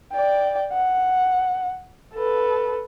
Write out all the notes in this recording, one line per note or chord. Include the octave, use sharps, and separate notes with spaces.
D5 G5
F#5
A4 B4